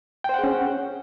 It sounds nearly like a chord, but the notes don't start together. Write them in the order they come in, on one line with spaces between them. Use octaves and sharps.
G5 C5 F#5 G#4 C#4